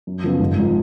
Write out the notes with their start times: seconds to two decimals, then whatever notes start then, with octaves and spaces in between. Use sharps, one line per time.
0.07 F#2
0.24 C#3 F3 B3 F4
0.40 G#1
0.57 G#2 F3